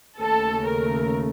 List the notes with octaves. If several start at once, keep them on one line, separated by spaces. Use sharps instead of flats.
D#2 C#3 A3 A4
A#4